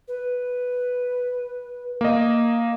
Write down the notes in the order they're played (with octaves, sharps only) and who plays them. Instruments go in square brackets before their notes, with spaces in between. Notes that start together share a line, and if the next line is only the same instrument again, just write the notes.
[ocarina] B4
[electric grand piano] A#3 D#5